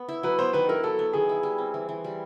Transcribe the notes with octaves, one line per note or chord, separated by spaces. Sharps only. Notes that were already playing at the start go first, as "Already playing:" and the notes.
Already playing: B3
E4
F#3 B4
B3 C5
D#3 B4
E4 A#4
F#3 A4
B3
D#3 G#4
E4
G3
C4
E3
E3
G3